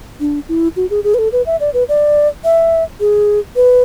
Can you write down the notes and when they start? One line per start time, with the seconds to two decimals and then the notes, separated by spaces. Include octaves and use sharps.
0.20 D4
0.49 E4
0.76 F#4
0.90 G#4
1.04 G#4
1.14 B4
1.19 A4
1.32 B4
1.46 E5
1.60 D5
1.74 B4
1.89 D5
2.45 E5
3.00 G#4
3.56 B4